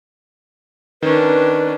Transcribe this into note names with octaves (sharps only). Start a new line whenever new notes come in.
D#3 C#4 D4 B4